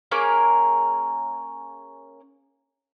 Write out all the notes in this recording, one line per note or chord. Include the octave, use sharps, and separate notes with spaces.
A#3 C#4 G#4 A#4